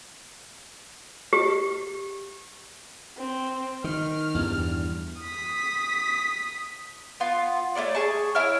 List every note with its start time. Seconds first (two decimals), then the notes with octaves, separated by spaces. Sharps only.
1.33 G4
3.18 C4
3.84 D#3 F6
4.35 E2 G2
5.21 D#6 B6
7.20 B3 F4
7.75 A3 C#4 C#5 D5
7.95 G#4 A5 C#6
8.35 E4 C#5 F6